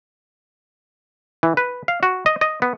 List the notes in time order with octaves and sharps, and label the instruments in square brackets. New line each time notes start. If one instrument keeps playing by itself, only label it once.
[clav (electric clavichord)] E3
B4
F5
F#4
D#5
D#5
B3